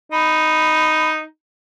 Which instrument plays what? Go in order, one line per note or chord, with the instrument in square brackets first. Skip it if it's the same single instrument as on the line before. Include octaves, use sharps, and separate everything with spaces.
[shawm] D#4 [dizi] B5